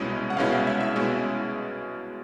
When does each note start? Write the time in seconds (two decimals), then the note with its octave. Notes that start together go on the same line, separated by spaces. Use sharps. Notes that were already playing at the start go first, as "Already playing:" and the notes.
Already playing: C2 B2 G#3 C#4 E4 D#5
0.30 F#5
0.37 C2 B2 G#3 C#4 E4 F5
0.53 E5
0.67 E5
0.81 E5
0.96 B2 G#3 C#4 E4